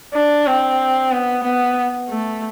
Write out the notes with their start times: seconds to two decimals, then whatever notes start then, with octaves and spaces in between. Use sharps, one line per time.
0.14 D4
0.47 C4
1.12 B3
1.44 B3
2.09 A3